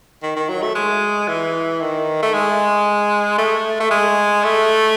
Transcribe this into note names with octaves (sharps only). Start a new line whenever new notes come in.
D#3
D#3
F#3
A3
G#3
E3
D#3
A3
G#3
A3
A3
G#3
A3